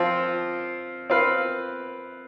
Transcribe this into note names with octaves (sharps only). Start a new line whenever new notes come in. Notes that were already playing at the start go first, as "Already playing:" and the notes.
Already playing: F3 C4 F4
C4 F4 B4 F5